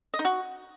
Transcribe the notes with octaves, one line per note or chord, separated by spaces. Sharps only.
D#5
D#4
F#4